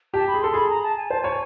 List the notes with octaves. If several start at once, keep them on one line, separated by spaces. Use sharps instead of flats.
G4 A5
B5
G#4
A4 C6
G#4 B5
A#5
A5
G#5
C5 A5
C#5 G#5